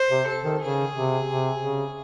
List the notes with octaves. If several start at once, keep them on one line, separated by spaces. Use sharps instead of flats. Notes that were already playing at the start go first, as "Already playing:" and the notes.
Already playing: C5
C3
A4
D#3
C#3 G#4
C3
C3
C#3